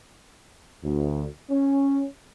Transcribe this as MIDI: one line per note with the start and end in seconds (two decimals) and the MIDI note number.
0.83 1.26 38
1.50 2.04 61